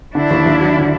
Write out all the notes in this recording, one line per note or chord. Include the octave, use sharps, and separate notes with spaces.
D3 D4 E4
D#2
D#2
F#3
D3